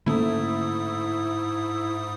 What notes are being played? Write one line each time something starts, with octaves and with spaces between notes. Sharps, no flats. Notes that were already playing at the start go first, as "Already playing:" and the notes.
G#2 D3 A3 A#3 C#4 E4 A4 D#6